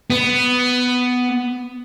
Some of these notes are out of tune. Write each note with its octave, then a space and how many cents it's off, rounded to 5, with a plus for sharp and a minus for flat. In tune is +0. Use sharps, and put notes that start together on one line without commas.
B3 +10